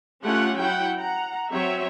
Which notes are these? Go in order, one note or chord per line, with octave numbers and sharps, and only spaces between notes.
A3 C#4 F4 G4 F#5
F#3 E4 F#5 G5
F#5 A#5
F#3 C4 C#5 E5